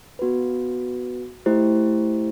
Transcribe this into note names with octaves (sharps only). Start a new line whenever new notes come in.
B3 F#4 B4
A3 E4 G4 C5